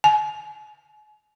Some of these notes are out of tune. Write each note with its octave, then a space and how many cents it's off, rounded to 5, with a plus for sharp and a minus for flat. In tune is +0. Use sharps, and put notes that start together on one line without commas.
G#5 +40